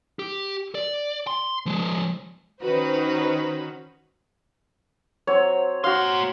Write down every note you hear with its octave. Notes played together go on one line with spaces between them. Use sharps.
G4
D5
C6
F3 G#3
D#3 C#4 D#4 F#4 B4 C5
F#3 C4 C#5
A#3 F#4 F5 C6